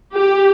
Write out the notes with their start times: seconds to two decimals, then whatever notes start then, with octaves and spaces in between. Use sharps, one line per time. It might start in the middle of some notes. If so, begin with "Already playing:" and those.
0.14 G4